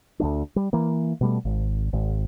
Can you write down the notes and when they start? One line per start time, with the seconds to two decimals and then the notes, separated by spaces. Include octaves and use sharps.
0.20 D2 A3 D4
0.56 G3
0.73 E3 A#3
1.21 B2 G3 A3
1.45 G#1
1.93 G#1